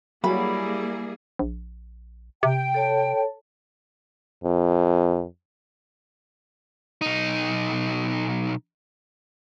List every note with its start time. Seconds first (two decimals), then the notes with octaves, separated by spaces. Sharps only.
0.24 F#3 G3 A#3 E4 G#4 B5
1.39 A#1
2.43 C3 G5
2.74 A4 C#5 A5
4.44 F2
7.01 B1 D#4